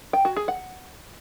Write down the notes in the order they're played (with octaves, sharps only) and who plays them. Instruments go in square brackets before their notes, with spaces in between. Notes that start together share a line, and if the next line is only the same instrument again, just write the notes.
[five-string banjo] G5
F#4
G#4
F#5